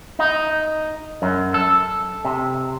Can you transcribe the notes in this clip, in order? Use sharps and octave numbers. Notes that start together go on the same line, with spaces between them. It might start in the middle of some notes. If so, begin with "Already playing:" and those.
D#4
F#2
A4
C3